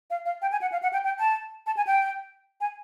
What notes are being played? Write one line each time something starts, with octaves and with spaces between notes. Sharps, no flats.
F5
F5
G5
G#5
F#5
F5
F#5
G5
G5
A5
A5
G#5
G5
G#5